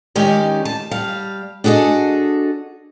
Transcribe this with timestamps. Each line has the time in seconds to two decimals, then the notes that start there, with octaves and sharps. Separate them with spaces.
0.15 D#3 G#3 C#4 D#4 G4 D5
0.65 A5
0.91 G3 F5
1.64 D4 F#4 G#4 A4 D#5